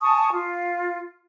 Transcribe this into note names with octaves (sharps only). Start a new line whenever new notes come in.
G#5 A5 C#6 D#6
F4